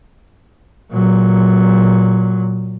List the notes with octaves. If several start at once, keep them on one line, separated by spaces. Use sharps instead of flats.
A#2 F#3